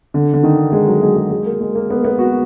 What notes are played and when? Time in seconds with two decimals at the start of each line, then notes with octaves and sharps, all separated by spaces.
0.14 D3
0.34 D3
0.44 D#3
0.72 G#3
0.87 F#3
1.02 G#3
1.16 G#3
1.31 G#3
1.45 A#3
1.61 G#3
1.75 A#3
1.90 B3
2.04 B3
2.19 F#4